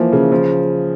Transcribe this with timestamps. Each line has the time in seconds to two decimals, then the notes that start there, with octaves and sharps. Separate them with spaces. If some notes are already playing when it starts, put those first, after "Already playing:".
Already playing: E3 F3 A#3
0.13 C#3
0.32 F3